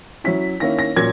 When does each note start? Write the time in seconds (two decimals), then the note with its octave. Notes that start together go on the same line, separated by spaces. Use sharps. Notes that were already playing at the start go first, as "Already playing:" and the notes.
0.24 F#3 C#4 E4 B6
0.60 D#3 A#3 C#4 E4 A#6
0.79 A#6
0.96 A#2 F#3 C#4 G#6